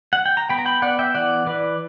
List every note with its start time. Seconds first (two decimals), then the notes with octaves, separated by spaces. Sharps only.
0.13 F#5
0.26 G5
0.37 A#5
0.49 B3 G5 B5
0.59 A#5
0.66 G5 B5
0.82 B3 D5 F#5
0.99 E5 G5
1.14 E3 D5 F#5
1.46 E3 B4 D5